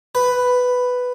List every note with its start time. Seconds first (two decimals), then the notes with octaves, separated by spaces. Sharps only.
0.15 B4